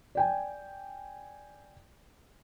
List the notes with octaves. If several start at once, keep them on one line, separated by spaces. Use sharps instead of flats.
D5 G5 G#5